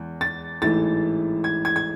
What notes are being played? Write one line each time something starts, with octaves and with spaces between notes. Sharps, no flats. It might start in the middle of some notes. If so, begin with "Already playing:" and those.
Already playing: E2 G#3
A6
A1 G#2 E3 A3 A6
G#6
G#6
G#6